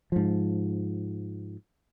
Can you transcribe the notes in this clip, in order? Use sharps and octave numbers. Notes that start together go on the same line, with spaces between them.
G#2 F3